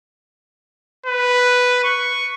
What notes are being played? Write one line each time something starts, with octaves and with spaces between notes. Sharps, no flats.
B4
C#6